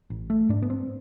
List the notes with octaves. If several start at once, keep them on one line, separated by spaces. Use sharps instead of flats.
A1
A3
G#2 D4
B3
C4